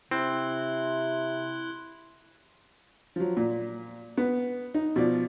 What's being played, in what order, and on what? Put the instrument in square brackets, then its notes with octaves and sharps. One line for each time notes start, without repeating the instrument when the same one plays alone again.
[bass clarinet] C3 [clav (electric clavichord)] C4 [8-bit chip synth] E4 C6 F#6
[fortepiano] F3 F#3
A#2
B3
D#4
B2 F3 D5